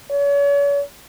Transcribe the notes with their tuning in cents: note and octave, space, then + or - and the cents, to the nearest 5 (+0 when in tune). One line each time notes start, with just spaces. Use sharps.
C#5 +40